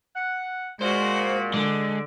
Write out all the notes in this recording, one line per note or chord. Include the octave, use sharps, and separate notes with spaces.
F#5
A#2 G#3 F#4 C5
D3 G#3